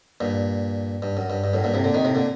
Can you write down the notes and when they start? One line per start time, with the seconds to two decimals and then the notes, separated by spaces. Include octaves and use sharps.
0.21 G2 A#2
1.02 G2
1.17 F#2
1.30 G2
1.44 G2
1.53 F#2 A2
1.64 G2 A#2
1.74 A2 C3
1.84 A#2 D3
1.94 C3 D#3
2.05 A2 C3
2.15 A#2 D3